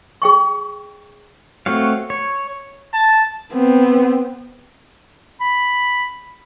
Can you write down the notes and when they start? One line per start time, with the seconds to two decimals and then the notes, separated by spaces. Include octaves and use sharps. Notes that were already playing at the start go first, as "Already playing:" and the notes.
0.22 G#4 G5 C#6
1.66 A3 C4 F#4 C#5 F5
2.10 C#5
2.94 A5
3.52 B3 C4
5.40 B5